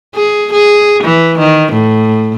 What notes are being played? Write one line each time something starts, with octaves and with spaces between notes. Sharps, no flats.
G#4
G#4
E3
D#3
A2